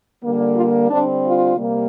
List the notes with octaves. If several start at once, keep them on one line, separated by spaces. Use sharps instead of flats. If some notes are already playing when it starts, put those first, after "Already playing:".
D3 G3 A#3
F4
D3 G3 C4 D4
F4
C3 G3 A#3